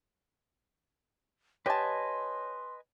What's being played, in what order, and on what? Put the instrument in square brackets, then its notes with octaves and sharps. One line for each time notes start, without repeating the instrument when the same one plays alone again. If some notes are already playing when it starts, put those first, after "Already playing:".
[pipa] G4 A5 [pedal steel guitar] B4 D#5 G#5 [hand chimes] C#5 [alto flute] C6